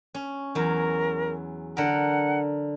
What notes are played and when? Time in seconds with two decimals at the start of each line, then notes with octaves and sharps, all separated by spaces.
0.14 C#4
0.55 E2 F#3 A#4
1.77 D3 A#4 F#5